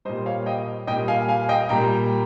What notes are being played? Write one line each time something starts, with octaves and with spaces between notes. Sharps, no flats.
A#2 G3 C5 D#5
C#5 F5
D#5 G5
A#2 G3 D#5 G5
F5 G#5
F5 G#5
D#5 G5
A#2 G3 G5 A#5